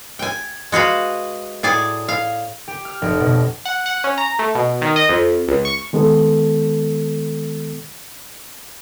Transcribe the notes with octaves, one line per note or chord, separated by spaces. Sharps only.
G5 G#5
G#3 F#4 B4 F5
A2 G#4 D5 G#5
F5
G4
F6
F1
B2
F#5
F#5
C#4
A#5
A3
B2
D#3
D#5
F2
C#2
C#6
D#3 G#3 B3 A4